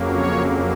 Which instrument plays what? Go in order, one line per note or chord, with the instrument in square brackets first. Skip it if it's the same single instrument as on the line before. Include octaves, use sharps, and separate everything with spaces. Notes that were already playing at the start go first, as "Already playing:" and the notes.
Already playing: [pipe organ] F2 C#3 F#3 A#3
C#5